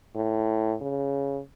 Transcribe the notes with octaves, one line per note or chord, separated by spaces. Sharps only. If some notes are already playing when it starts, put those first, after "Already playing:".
A2
C#3